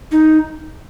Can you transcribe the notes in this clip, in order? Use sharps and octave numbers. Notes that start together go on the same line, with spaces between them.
D#4